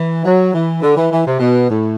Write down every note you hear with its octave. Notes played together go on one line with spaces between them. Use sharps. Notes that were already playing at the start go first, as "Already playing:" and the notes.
Already playing: E3
F#3
E3
D3
E3
E3
C3
B2
A2